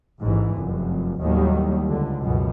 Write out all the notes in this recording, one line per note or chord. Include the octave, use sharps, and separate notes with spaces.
A1 G#2 E3
F1 F#2
D#2 A2 D#3 F#3 G3
C#2 D3
C#2 F#2 B2